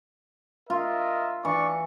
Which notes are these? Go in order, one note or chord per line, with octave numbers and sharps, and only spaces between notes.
F4 A#4 D#5 E5
E3 D4 D5 C#6